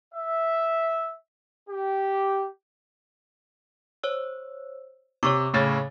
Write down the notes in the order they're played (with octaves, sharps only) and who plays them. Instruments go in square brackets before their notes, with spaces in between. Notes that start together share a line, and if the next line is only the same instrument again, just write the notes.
[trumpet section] E5
G4
[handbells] C5 C#5 E6
[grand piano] C3 [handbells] C#5 C#6 D6
[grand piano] A2 C#3 A6